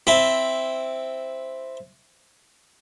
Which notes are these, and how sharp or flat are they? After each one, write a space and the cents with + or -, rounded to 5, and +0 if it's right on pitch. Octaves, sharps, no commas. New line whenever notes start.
C4 +0 E4 +0